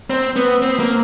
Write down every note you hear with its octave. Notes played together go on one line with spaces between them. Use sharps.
C4
B3
C4
A#3